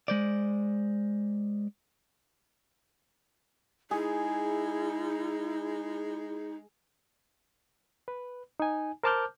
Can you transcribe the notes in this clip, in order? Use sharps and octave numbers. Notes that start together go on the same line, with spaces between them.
G#3 C5 D5
G#3 D#4 E4 G#4
B4
D#4 G#5
A#4 C5 A5 D6 F6 G6